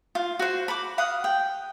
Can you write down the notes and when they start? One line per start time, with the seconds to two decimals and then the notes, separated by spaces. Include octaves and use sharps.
0.15 F4
0.39 F#4 C5
0.68 B5 D6
0.98 F5 F#5 D#6
1.24 G5